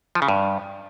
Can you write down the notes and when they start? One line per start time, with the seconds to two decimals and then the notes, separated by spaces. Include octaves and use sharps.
0.15 F3
0.22 C#3
0.28 G2